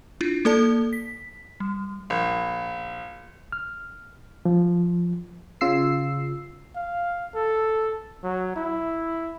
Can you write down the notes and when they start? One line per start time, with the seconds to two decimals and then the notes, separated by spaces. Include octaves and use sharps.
0.21 D4 E4 F4
0.45 A#3 D#4 A4 D5 A5
0.93 B6
1.60 G3
2.10 A#1
3.52 F6
4.45 F3
5.61 C#3 F4 E6 C7
6.75 F5
7.35 A4
8.24 F#3
8.56 E4